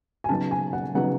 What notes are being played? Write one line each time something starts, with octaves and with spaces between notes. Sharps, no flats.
G#5
C#3 F#3 B3 D#4 A5
G#5
F#5
C#3 F#3 B3 D#4 F#5